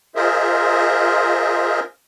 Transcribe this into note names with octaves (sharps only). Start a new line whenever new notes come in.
F4 G#4 A#4 C5 D#5 E5